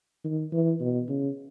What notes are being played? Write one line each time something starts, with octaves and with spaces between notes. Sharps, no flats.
D#3
E3
B2
C#3